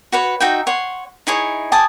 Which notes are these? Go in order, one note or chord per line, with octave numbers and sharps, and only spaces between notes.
F#4 B4 C#5
D#4 F#4 E5 G5
C#5 F#5 C6
D#4 E4 G#4 C#5
G4 G#5 A5 D#6